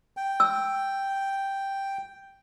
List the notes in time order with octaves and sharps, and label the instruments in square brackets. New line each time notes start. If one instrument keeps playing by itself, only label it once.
[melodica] G5
[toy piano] E6